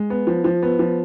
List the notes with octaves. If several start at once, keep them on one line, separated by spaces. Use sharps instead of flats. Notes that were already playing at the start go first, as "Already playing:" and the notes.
Already playing: G#3
B3
F3
F3
B3
F3